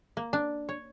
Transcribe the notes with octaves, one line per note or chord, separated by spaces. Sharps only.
A#3
D4
C#5